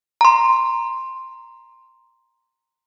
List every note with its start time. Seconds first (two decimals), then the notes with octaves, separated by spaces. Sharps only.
0.21 A#5 C6